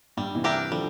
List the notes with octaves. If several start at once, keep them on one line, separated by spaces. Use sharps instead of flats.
G2 G3
C3 E3
D4 G4 A#4 E5
D3 F3 G3